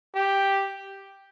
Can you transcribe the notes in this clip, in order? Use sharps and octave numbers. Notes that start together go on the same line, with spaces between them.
G4